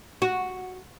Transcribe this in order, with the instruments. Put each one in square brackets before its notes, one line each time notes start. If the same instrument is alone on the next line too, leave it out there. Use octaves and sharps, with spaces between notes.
[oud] F#4